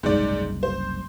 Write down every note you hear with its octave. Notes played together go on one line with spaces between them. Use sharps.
F#1 C2 G#2 D5
C5